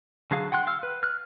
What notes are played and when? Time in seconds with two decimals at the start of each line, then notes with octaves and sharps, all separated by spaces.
0.31 D3 F#3 G#4 F5
0.52 F#5 G5 C6 F#6
0.67 F5 E6 F6
0.83 B4
1.03 F6 F#6